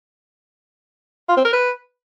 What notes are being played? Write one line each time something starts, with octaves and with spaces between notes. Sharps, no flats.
F4
C4
A#4
B4